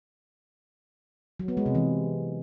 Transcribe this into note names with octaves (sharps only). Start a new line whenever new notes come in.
F#3
B3
G#3
C3
E3